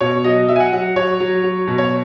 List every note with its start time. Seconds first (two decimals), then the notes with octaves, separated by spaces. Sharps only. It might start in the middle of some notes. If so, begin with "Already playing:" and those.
0.01 B2 C#5
0.24 F#3 D#5
0.48 F#3 E5
0.56 G#5
0.60 F#5
0.73 F#3 F#5
0.96 F#3 C#5
1.20 F#3
1.44 F#3
1.67 B2
1.78 C#5